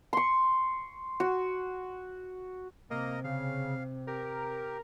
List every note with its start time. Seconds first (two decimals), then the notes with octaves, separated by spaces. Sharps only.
0.13 C6 C#6
1.20 F#4
2.90 C3 A#3 A#4 D#5
3.24 C#3 F5
4.07 G4 A#4